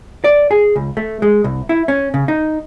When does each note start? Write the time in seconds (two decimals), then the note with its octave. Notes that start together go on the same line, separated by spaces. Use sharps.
0.24 D5
0.51 G#4
0.76 C#2
0.97 A3
1.22 G#3
1.44 C2
1.69 E4
1.88 C#4
2.14 C#3
2.28 D#4